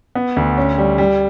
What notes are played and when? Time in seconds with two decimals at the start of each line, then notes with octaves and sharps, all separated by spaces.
0.15 B3
0.36 D2
0.58 C#4
0.78 G3
0.98 G3